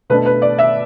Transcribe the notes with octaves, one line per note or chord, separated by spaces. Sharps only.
B2 A3 D4 B4
B4
D5
E5